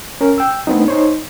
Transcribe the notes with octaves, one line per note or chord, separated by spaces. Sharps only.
C#4 A#4
G5 E6
A3 B3 C4 D4 D#4
D#4 C5 C#5